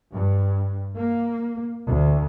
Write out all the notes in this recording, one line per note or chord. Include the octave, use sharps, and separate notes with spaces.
G2
A#3
D2